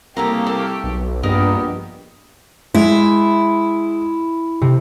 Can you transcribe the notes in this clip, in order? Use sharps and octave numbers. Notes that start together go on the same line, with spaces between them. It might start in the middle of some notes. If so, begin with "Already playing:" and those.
C2 C#3 A3 A#3 G4 A4 A#5
A4
B1
A#1 G2 B3 D#4 G4 A#4
G#3 E4
C3